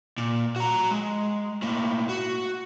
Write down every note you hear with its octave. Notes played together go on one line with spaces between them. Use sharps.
A#2
F#4 A#5
G#3
A2 A#3
F#4